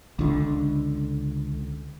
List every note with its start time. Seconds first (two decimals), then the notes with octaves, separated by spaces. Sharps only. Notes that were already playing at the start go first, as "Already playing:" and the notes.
0.19 C#2 D3